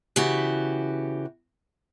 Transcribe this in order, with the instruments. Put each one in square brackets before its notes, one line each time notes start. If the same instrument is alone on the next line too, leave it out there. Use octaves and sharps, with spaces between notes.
[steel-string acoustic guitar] C#3 E3 B3 F#4 G4